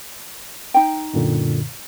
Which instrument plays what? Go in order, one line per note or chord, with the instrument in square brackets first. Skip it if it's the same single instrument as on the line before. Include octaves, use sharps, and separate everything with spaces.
[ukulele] D#4 G5
[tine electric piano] F#2 A#2 D3